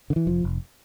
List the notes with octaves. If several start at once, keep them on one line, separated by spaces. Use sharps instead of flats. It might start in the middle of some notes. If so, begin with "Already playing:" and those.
D3
E3
F1 F3
F1